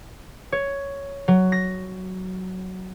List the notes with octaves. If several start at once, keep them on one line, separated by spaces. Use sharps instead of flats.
C#5
F#3
A#6